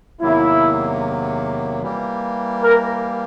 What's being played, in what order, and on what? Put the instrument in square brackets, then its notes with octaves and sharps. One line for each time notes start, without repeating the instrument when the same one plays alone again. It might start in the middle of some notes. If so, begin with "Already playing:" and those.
[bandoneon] E2 C3 D#3 F#3 A#3 [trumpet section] E4
[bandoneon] E3 G3 A#3
[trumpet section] A#4